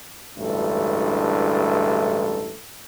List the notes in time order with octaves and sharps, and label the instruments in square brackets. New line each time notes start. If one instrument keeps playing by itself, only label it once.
[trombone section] A1 D2 G2 G#3 E4 A4